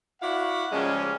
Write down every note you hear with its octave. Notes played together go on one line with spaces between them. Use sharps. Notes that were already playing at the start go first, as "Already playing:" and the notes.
E4 F#4 D5 F5 F#5
C#3 F3 G3 G#3 A#3 C#4